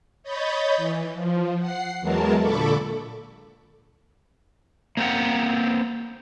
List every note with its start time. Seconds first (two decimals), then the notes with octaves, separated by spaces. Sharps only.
0.23 C#5 D#5 B5 G6 A6
0.77 E3
1.14 F3
1.58 F#5 C7
2.01 E2 E3 F#3 G#3 A#4 A5
2.40 A#2 D3 A4 B5 C#6 D6
4.97 A#3 C4 C5 F#5